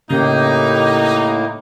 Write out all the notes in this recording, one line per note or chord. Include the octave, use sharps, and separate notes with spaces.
A2 C#3 A#3 D#4 G4